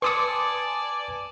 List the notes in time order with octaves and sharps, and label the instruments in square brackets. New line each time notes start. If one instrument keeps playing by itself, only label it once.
[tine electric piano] B4 C#7 [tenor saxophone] D5 [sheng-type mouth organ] G#5 A5 [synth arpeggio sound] C6 D6 D#6